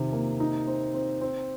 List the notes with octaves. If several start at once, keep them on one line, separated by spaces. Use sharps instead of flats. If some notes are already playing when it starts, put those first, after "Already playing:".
Already playing: C3 D#3
A#3
D#4
C4
C4
C4